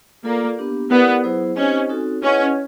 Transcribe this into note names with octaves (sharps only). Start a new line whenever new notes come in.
A#3 F4 A4 D5
B3 D4 G4
B3 E4 G4 A#4 D5 F#5
F#3 B3 E4 G#4 C5
C4 C#4 D#4 G4 C5 D#5
C4 D#4 F#4 A4
C#4 E4 G#4 B4 D#5 F#5